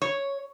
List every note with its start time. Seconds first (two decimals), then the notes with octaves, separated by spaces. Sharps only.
0.02 C#5